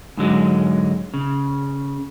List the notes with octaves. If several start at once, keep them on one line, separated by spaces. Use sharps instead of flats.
G#2 D3 F#3 G#3
C#3